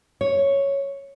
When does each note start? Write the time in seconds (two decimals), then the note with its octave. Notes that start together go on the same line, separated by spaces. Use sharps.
0.21 C#5